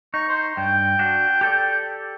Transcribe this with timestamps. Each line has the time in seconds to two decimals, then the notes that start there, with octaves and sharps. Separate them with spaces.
0.14 D#4 C#6
0.28 C5
0.57 G2 G5
0.99 D4 F#4
1.41 G4 A4 D5